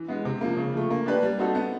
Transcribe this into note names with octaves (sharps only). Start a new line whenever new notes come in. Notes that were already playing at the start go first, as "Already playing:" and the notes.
Already playing: E3
G#3 B3
C3
F3 A#3
C#3
F3 A3
A#3
D4 G4 B4 D5
G3
C4 D#4 F#4 A4
B3